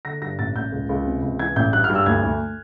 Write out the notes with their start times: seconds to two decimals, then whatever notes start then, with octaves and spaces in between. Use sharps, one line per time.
0.05 D3 A#6
0.21 G2 A#6
0.39 A1 A6
0.56 A1 G6
0.72 C#2
0.89 C#2
1.06 C3
1.22 C#2
1.39 E3 G#6
1.56 A1 G6
1.73 G2 F#6
1.84 F6
1.89 G2
1.95 E6
2.06 D2 G#6
2.23 D2